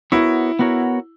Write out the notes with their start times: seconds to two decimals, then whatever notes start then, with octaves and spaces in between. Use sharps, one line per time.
0.12 B3 E4 F#4 A#4 C#5
0.59 B3 F#4 A#4 C#5